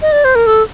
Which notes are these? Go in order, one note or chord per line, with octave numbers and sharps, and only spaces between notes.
D#5
D5
C5
A#4
A4